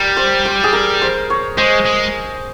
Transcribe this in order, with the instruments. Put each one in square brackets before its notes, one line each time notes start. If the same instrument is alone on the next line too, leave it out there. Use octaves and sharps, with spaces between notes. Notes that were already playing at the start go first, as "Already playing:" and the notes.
Already playing: [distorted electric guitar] G3 [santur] A#4
[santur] C5
C5
G#4
A#4
C5
C#5
[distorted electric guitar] G#3 [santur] C5
[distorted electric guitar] G#3